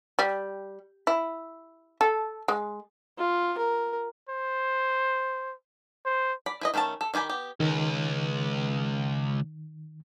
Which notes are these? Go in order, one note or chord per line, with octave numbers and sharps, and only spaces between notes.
G3
E4
A4
G#3
F4
A#4
C5
C5
D5 B5
E4 B4 D#5
D#3 A3 C#4 E4 A5
A4
D#3 E4 G4 G#5 B5
B3 G4
C#2 D#3